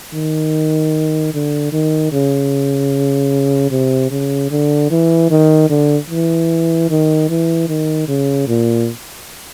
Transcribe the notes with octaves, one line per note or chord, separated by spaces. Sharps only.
D#3
D3
D#3
C#3
C3
C#3
D3
E3
D#3
D3
E3
D#3
E3
D#3
C#3
A#2